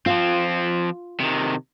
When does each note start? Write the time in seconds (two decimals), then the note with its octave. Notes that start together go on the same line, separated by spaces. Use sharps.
0.06 F3 C4 F4
1.20 C3 D#3